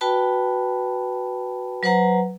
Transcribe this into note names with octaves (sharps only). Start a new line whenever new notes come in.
F#4 B4 G5 A5 B5
F#3 B4 C5 F#5 A#5